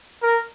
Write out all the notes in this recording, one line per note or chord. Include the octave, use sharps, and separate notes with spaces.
A#4